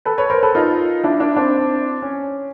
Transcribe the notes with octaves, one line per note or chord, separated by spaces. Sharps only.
A4 B4
B4 C#5
A#4 C5
A4 B4
D#4 F4
D4 E4
D4 E4
C4 D4
C#4